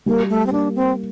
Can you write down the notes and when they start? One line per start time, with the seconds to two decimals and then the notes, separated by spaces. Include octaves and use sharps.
0.06 G3 A#3
0.29 A3
0.47 C4
0.52 A#3 D4
0.76 C4